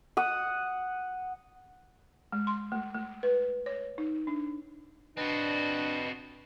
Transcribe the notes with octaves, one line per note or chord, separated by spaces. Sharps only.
F#5 D#6
G#3
C6
A3
A3
B4
C#5
D#4
D4
C4 D4 F#4 B4 D#5 A5